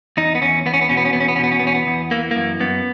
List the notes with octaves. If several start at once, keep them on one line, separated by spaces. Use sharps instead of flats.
E2 D#4
B3
E2 C#4
E2 B3
C#4
B3
B2 C#4
B3
C#4
E2 B3
C#4
B3
C#4
B2 B3
C#4
B3
E2 C#4
B3
E2
E3 A#3
F#2 A#3
F#2 B3